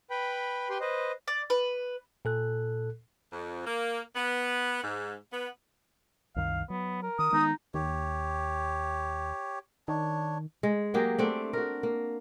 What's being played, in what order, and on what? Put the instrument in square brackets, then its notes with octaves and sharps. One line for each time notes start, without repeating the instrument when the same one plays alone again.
[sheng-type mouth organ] B4 G5 B5
G4 B4 G5 C6
B4 C5 D#5
[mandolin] D5
B4
[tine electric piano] A#2 A4 F#6
[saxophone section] F2
A#3
B3
G#2
B3
[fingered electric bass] C2 F#2 D#3 [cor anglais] F5
[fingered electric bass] F#3 [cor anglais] B3
[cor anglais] A#4
[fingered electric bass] D#3 [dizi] D#6
[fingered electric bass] D#3 G#3 B3 [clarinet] D#4
[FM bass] D#2 [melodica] G4 C#5
[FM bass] D#3 [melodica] D4 C#5
[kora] G#3
F#3 A#3 G4 G#4
A3 C4 D4
F#4 A#4
A#3